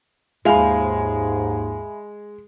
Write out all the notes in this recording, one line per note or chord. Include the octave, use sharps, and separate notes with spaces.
D#2 G#2 F3 G#3 E5 F5 G#5 B5